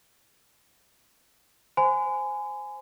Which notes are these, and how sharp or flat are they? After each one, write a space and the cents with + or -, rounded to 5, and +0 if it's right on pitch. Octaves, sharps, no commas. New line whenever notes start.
C5 +0 G#5 +5 C6 -45